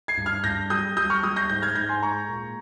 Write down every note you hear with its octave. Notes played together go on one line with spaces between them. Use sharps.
G#6 C7
G2
F6 G#6
G2 G6 A#6
G3 D#6 G6
G3 D#6 G6
C#6 F6
G3 D#6 G6
G6 A#6
G#2 G6 A#6
F6 G#6
G#2 G6 A#6
G#5 C6
G#3 A#5 C#6
A#2